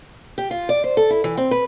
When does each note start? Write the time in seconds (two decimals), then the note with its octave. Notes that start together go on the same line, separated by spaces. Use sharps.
0.38 G4
0.51 F4
0.69 D5
0.84 C5
0.97 A4
1.10 E4
1.24 E3
1.37 C4
1.51 B4